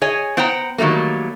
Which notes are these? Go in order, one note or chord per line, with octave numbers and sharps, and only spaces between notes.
G#4 C#5 D#5 G#5
B3 C5 F#5 G5 A#5
D#3 F#3 G3 A3 A#3